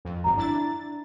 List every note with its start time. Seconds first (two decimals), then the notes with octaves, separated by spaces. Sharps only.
0.05 F2
0.24 G#1 F#2 A#5
0.37 D4 E4 A6